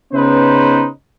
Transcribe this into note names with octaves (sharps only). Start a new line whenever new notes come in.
C#3 B3 C#4 D#4 B4 C5